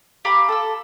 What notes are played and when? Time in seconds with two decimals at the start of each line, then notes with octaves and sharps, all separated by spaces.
0.25 G4 F5 A#5 B5
0.49 A4 D#6 E6